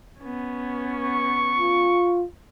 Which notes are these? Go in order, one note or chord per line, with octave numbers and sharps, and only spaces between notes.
B3 C#4
C#6
F4